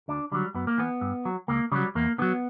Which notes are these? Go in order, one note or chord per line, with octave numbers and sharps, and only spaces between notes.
D2 D4
D3 F#3 G3
F#2 B3
A#3
E3 B3
G2
F#3
C#2 A#3
C#3 F#3 G3
E2 A#3
D3 F#3 B3